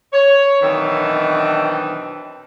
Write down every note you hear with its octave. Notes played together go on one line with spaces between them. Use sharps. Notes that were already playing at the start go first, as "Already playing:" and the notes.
C#5
B2 D#3 E3 F#3 C4 D4